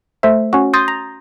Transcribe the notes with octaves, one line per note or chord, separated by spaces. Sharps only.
A3 C5 E5
C#4 F#4
C6 D#6 G6 A6 A#6
A#5